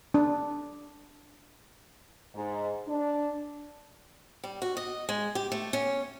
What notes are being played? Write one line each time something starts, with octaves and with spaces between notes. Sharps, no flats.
D4
G#2
D4
G3
F#4
D#5
G#3
G4
A3
C#4